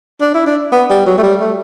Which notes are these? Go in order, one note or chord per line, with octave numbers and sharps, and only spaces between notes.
D4
E4
D4
B3
G3
F#3
A3
G3
A3